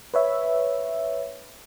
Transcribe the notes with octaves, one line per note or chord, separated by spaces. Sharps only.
B4 C#5 E5